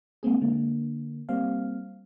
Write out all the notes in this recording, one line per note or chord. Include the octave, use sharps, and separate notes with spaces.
G#3 A#3 C4 G#4
D3 A#3
G3 A#3 C4 F5